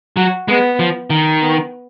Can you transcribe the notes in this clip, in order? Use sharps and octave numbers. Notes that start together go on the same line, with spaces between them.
F#3 F#4
G#3 B3
F3
D#3
B3